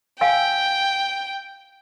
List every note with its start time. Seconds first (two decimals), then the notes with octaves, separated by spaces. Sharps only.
0.21 F5 G5 G#5 E6